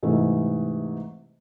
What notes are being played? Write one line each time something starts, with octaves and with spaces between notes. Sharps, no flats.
G#2 C3 E3 A3